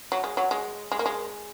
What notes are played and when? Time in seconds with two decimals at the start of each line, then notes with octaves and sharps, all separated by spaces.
0.12 F#3
0.24 G#3
0.37 F#3
0.51 G#3
0.92 G#3
0.99 A#3
1.06 G#3